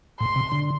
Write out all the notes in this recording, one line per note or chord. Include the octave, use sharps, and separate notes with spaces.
A2 C6
C3
D3